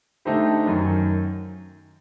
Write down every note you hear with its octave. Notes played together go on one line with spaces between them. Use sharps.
D3 A3 D#4 G4 C5
F#2 D#3 F#3